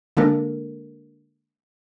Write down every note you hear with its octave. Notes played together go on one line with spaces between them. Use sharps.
D3 G#3 A#3 D4 A4 A#4